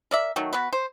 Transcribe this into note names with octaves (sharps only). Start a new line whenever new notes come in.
A#4 D5 E5
D#3 F#3 A3
B3 F#4 B4
C5